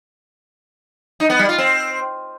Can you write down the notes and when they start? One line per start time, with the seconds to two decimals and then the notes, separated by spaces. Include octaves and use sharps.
1.20 D#4
1.30 B3
1.39 G3
1.49 F4
1.58 C4